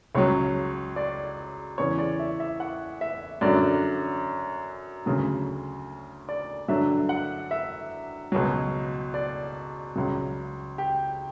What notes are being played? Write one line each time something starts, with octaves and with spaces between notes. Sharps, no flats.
C#2 C#3 F#3 C#5
D5
E2 C#3 E3 C#5
D5
E5
E5
F#5
E5
F#2 D3 F#3 D5
D2 C#3 F#3
D5
G2 D3 F#3 E5
F#5
E5
C#2 B2 F#3
D5
C#2 C#3 F#3
G4